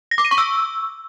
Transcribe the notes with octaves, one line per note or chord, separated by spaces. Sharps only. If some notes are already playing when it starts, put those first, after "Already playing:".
A#6
D6
D#7
C#6
E6